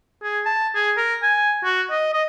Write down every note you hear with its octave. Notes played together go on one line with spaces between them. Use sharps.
G#4
A5
G#4
A#4
G#5
F#4
D#5
D#5